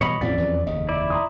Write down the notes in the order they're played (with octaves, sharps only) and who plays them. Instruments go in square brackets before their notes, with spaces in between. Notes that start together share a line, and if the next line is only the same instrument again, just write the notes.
[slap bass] B2 E3 G3 [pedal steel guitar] C#5 D#5 B5
[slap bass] A1 B2 E3 [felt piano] F2 C#4 B6 [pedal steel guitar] D5
[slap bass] E2 E3 F#3
[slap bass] F1 D#2 C#3 [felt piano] D#5
[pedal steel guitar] E4 D5
[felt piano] A#5 C6 D#6